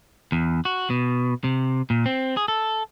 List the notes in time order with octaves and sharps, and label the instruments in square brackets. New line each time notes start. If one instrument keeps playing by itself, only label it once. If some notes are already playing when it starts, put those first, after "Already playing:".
[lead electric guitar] E2
F#4
B2
C3
A#2
C4
G#4
A4